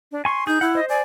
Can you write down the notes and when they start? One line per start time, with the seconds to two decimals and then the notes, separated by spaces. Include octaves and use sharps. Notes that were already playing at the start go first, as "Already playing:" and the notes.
0.12 D4
0.25 G#5 C6 C#6
0.47 D#4 G#4 G6
0.61 E4 F#5
0.75 C5 D#5
0.89 D5 G#5